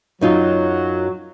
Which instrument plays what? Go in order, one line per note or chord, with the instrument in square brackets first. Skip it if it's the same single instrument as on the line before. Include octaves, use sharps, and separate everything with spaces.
[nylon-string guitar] F#2 D#4 F4 [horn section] F#3